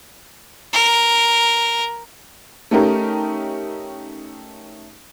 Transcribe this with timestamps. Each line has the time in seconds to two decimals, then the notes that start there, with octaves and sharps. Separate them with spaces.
0.73 A#4
2.71 A3 C#4 D#4 G4 A#4